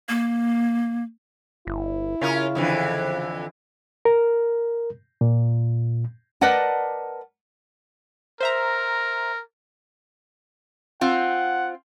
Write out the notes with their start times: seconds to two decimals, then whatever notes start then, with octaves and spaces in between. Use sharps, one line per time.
0.09 A#3
1.67 G1 E4
2.21 C#3 C#4 F4 A#4
2.55 F2 D3 E3
4.05 A#4
5.21 A#2
6.41 A#4 B4 D5 D#5 F#5 A5
8.40 A#4 C5 E5 A#5
11.01 C4 F4 F#5